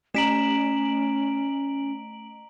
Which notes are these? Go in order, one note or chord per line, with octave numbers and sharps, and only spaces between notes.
A3 C#4 A#5 B6 D7 E7 F#7